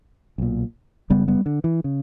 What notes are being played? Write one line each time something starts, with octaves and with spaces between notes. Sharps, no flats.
B1 A#2
F#1 F#2 C#3 G3 B3
G3 B3
D3
E3
C#3